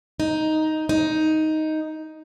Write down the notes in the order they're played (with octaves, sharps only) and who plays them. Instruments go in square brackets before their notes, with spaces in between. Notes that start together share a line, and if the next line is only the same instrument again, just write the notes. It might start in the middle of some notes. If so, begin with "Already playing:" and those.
[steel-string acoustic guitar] D#4
D#4